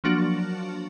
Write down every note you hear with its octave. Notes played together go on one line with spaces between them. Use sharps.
F3 F#3 A#3 D4 F#4